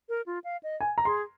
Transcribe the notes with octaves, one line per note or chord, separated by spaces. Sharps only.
A#4
F4
F5
D#5
G#5
A#5
G#4 C6